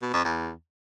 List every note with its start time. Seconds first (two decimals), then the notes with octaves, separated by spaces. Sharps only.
0.02 B2
0.13 F2
0.25 E2